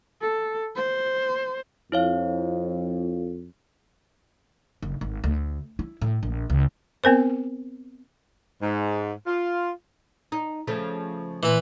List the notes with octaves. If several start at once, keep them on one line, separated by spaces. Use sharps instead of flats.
A4
C5
F2 E4 C#5 F5
F#1
G#1
D2
E4
A2
A#1
C#2
B3 C4 A#4 C5
G#2
F4
D#4
C#3 F3 A3
A#2 E3 B4